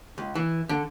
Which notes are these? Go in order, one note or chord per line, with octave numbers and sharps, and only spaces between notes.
C#2
E3
D3